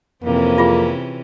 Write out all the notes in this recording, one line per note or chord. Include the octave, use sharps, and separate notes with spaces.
F2 C3 E3 A#3 C#4
F4 G#4